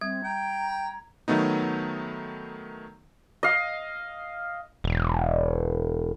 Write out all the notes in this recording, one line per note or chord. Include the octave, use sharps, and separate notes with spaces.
G3 C4 G#6
G5 A#5
D#3 F#3 A3 B3 D#4
D#5 F5
E1